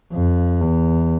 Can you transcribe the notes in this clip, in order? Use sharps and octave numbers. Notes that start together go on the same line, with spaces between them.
F2
E2